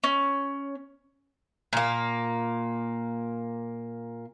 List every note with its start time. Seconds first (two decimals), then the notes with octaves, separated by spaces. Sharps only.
0.04 C#4
1.73 A#2 A#3